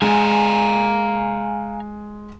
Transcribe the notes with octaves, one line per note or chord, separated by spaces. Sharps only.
G#3 F5 G#5 A#5